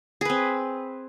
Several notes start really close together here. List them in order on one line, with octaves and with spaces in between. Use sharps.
G#4 B4 C4